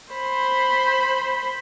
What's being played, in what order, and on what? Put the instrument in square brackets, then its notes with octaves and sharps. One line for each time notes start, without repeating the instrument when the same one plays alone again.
[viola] C5 B5